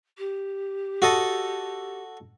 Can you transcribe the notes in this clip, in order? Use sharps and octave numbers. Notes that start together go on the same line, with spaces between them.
G4
F#4 A4 D#5